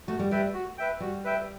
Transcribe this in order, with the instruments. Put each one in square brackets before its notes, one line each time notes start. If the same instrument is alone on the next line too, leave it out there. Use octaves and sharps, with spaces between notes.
[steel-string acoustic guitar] A3 [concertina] F#4
[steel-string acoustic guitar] G3
[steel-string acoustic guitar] G3 [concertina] B4 E5 G5
[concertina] F#4
B4 E5 G5
[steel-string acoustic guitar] G3 [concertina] F#4
[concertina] B4 E5 G5